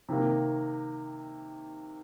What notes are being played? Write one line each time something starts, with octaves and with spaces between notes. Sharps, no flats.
C3 D#3 A#3